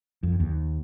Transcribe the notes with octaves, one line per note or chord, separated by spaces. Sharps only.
F2
D#2